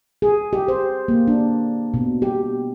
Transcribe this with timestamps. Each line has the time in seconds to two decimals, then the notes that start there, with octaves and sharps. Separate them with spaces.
0.22 G#4
0.53 G4
0.68 C5
1.08 A#3
1.28 D4
1.94 B2
2.22 G4